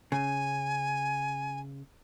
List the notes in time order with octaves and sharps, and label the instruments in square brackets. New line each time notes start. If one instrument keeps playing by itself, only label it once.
[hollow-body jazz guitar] C#3 [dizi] G#5